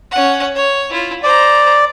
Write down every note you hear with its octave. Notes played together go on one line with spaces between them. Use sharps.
C#4 F#5
C#5
E4 F4
C5 D5 A#5